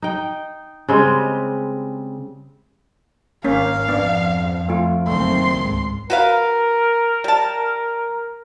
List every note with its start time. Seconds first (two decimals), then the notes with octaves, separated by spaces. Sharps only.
0.02 D#4 G5
0.88 C#3 G3 G#3 C4
3.44 G#1 A#3 C#4 F5
3.89 F2 B3 D4
4.69 A3 F4
5.07 F#1 D#3 A3 C4 C6
5.58 C#2 G#2
6.10 F#4 A#4 B4 F5
7.24 G3 A5